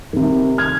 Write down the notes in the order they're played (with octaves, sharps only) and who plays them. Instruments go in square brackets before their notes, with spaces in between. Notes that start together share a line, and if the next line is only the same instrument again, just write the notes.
[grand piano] C3 D#3
F6 G#6